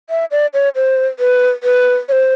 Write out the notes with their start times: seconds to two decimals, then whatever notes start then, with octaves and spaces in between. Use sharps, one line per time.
0.10 E5
0.31 D5
0.54 C#5
0.75 C5
1.19 B4
1.63 B4
2.09 C#5
2.12 C5